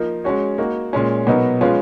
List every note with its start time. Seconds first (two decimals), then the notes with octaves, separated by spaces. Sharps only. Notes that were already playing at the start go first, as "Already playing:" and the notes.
Already playing: F3 A#3 D#4 A#4
0.24 G#3 C#4 F#4 C#5
0.58 A#3 D#4 F#4
0.93 A#2 G#3 C#4
1.27 B2 F#3 B3 D#4 A#4
1.61 F3 G#3 C#4 F4 B4